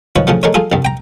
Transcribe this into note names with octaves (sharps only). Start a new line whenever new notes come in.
D#3 F3 B4 C#5
C#3 E3 F3 A3
G#3 A3 A#4 C#5
F4 G#4 A4
C2 G2
G5 A#5